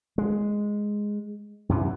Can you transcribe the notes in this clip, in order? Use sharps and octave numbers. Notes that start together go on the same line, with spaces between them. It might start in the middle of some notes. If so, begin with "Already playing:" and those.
G#3
F#2 C3 E3